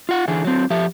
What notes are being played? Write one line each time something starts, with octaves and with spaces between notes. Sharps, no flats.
F4 F#5
D3 E3 E4 G#4
F#3 C4
F3 G4 E5